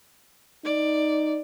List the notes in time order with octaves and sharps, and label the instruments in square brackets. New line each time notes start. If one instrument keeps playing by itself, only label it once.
[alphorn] D#4 [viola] D5